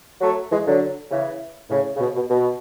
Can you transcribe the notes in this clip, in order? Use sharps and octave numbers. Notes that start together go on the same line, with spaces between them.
F#3 A3
E3 G#3
D3 F#3
C#3 E3
A2 C#3
C#3
B2
B2
B2